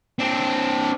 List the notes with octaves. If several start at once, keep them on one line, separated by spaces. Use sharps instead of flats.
C4 D4